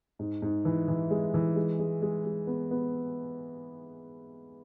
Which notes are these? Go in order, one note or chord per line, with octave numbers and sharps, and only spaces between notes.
G#2
G#2
E3
E3
G#3
E3
G#3
G#3
G#3
G#3
B3
B3